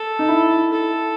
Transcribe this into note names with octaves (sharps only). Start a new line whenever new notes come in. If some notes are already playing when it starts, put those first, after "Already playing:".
Already playing: A4
D#4
E4
A4